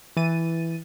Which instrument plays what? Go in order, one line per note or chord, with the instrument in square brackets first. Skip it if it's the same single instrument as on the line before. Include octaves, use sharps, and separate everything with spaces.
[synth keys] E3 A6 D#7